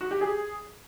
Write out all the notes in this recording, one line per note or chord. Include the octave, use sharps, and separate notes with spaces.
F#4
G4
G#4